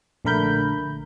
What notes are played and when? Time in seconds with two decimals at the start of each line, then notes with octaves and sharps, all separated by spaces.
0.25 A#1 D3 A3 A#4 B5 G6